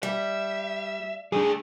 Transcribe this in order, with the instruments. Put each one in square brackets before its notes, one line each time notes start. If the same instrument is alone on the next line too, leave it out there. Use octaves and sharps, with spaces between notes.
[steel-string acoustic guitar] G3 [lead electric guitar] E5
[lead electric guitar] A#2 A3 [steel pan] G3 D4 [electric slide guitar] G#4